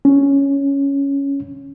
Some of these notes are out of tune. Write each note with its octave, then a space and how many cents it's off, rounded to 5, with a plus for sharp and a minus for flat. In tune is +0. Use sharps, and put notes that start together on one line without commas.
C#4 +5